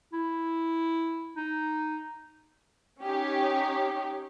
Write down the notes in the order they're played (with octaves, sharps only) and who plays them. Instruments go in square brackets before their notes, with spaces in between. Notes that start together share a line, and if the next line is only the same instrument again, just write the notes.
[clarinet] E4
D#4
[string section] C#4 D#4 G4 C#5